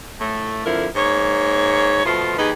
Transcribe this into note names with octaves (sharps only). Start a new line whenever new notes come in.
A2 A3
F2 D3 F3 E4 A#4
G#2 A#3 C#5
B2 F3 A3 F4
D#2 D#4 G4 G#4 B4